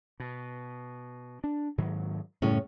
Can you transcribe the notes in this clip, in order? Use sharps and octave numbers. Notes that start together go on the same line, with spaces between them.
B2
D4
G#2 D#3 F#3
F#2 A2 C#3 G3 C#4